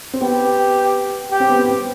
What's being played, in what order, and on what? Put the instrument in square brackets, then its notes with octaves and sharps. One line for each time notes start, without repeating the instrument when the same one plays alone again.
[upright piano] C4
[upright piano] B3 [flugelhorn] G4
[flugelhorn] G4
[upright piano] C4
B3
C4